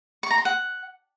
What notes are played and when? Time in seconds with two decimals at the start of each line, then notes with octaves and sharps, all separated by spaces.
0.23 C#6
0.31 A#5
0.38 C6
0.45 F#5